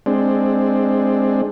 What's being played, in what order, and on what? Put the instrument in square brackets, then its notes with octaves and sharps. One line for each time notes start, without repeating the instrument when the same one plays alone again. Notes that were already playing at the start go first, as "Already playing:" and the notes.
[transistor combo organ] G#3 C4 D4